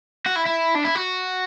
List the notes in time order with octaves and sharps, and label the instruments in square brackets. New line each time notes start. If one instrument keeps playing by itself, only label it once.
[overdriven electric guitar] F#4
E4
E4
D4
E4
F#4